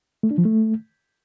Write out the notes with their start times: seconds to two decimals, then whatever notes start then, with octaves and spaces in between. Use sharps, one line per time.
0.23 A3
0.31 D4
0.38 F3
0.45 A3